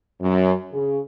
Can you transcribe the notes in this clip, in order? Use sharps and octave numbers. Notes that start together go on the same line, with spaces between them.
F#2
C#3